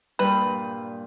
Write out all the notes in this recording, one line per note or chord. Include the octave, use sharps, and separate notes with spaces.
G2 A#2 G3 B4